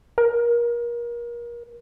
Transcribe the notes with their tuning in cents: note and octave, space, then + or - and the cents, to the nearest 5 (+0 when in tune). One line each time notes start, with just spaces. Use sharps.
A#4 +30